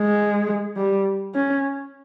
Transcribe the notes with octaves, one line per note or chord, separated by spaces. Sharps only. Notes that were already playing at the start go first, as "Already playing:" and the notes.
Already playing: G#3
G3
C#4